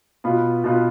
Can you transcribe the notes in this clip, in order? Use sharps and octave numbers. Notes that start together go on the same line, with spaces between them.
B2 B3 F4 B4
B2 B3 F4 B4